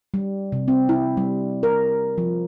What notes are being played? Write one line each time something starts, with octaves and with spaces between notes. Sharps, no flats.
G3
C3
C4
E4
G3
A#4
F3